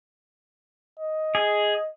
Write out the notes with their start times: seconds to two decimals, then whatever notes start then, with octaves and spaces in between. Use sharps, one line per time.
0.99 D#5
1.35 G#4